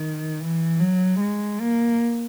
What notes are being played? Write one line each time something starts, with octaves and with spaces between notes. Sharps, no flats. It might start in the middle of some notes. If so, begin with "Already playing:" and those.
Already playing: D#3
E3
F#3
G#3
A#3